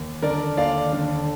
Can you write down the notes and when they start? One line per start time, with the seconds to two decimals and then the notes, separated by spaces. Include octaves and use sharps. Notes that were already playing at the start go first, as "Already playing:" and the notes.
Already playing: D#2
0.22 D3 A#4 D5
0.57 D#2 D5 F5
0.93 D3